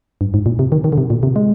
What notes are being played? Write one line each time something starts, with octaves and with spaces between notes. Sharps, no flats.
G2
G#2
A#2
C3
D#3
D#3
D3
C3
A#2
C3
G#3